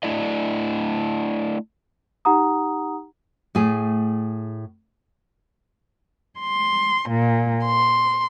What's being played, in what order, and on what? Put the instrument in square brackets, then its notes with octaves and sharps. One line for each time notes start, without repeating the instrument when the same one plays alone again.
[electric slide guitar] A3 D4 E4 D5 D#5
[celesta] D#4 G4 F#5 A#5 D#6
[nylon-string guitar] A2 A3 G#4
[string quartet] C6
A#2
C6